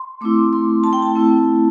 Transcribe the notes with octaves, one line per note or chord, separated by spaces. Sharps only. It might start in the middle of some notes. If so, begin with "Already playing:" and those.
Already playing: C6
A3 C4 E4 D6
C6
A5
G5
A5
A3 C4 E4